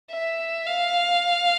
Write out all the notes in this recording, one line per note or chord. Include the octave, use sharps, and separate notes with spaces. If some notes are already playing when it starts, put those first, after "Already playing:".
E5
F5